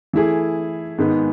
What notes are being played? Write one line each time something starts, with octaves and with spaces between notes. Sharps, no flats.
E3 A3 E4 G#4
G#2 D#3 G#3 B3